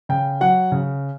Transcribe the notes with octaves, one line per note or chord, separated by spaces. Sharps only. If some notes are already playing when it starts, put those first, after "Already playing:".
C#3 G5
F#3 F#5
C#3